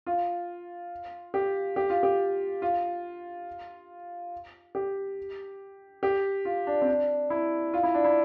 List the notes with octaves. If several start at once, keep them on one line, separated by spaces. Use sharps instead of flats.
F4
G4
G4
F4
G4
F4
G4
G4
F4
D4
C4
D4
E4
F4
E4
D4
E4